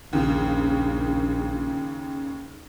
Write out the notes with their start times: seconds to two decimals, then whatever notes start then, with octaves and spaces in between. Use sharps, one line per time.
0.13 A#1 D#2 C#3